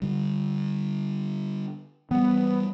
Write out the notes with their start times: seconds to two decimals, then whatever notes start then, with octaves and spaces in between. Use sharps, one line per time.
0.02 D3 G3
2.11 E3 G3 B3